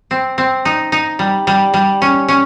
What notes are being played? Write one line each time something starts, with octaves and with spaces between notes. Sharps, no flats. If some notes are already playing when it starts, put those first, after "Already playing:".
C4
C4
D#4
D#4
G3
G3
G3
C#4
C#4